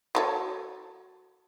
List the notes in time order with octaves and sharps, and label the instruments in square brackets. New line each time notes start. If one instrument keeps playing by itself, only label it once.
[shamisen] F#3 A4 C#5